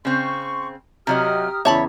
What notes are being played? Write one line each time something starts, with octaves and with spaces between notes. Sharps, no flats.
C#3 C4 C6 C#6
C3 F#3 G4 D#5 A#5 D#6 F6
E2 C#3 C#5 E5 A5 B5